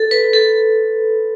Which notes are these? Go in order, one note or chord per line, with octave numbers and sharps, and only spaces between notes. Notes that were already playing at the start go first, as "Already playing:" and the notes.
Already playing: A4
B4
A4